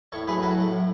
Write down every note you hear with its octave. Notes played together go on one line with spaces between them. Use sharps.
A2 A4 C#5
F#3 A3 G#4 B4
A2 F#4 A4
F#3 A3
A2